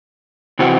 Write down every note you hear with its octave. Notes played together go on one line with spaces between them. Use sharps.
C3 E3 C4 F#4